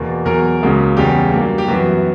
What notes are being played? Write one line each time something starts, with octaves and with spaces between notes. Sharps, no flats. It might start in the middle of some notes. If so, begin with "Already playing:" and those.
Already playing: E2 B2 A#3
E2 B2 F#3 A#4
C#2 C#3 F#3 A#3
E2 C#3 G3 G4
G2 F#3 A#3
G4
F#2 E3 B3 F#4